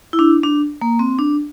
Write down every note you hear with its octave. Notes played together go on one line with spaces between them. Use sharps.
E4
D4
D4
A#3
C4
D4